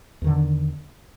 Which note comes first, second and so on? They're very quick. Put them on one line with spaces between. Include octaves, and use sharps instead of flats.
E2 D#3 D3